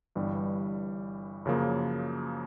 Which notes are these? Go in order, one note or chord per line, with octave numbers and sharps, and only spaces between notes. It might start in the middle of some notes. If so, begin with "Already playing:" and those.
G1 G2 E3 G3
F#2 C#3 F3 A#3